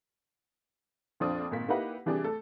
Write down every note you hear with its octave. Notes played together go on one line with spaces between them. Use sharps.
A#1 F2 F3 C4 D4 D#6
G#1 A#2 B6
A#3 D#4 E4 G4 B4 F#5
C3 E3 G3 D4 G4 G#4
A3 A4